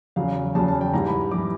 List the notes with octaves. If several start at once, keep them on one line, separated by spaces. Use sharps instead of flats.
E2 C#3 F#3 F5
E2 C#3 F#3 A5
A5
G5
G#2 E3 G3 A#5
B5
E3 G3 D6